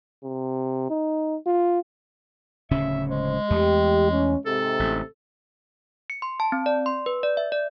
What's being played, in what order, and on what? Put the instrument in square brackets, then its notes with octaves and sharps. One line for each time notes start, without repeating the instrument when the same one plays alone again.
[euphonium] C3
D#4
F4
[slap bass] D1 C#3 C#4 [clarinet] E5
[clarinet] G#3 [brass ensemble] C5
[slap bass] E2 A3 [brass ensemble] G4
[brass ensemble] C#4
[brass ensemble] G#2 C3 [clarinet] A4
[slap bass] A1
[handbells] C#7
C6
A5
C4
D5
C6
B4
D5
E5
D5